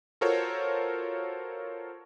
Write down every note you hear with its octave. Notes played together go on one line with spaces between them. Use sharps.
F4 F#4 A4 A#4 C5 C#5